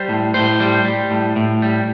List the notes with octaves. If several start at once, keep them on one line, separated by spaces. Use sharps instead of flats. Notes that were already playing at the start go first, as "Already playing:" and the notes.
Already playing: G3 C5
A2
A2 C5
G3
G3
A2
A2
G3